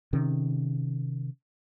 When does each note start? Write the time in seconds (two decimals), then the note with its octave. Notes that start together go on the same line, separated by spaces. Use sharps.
0.13 C3 D#3 C#4